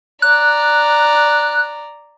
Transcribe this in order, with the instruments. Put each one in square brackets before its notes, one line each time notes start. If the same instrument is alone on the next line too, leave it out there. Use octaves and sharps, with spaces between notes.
[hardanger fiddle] D5 A#5 [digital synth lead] F#6